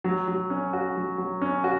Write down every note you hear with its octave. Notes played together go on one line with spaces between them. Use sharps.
F#3
F#3
C#4
F#4
F#3
F#3
C#4
F#4